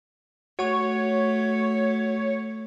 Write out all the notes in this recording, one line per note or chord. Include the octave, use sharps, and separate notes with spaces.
A3 F#4 C#5 F#5 C#6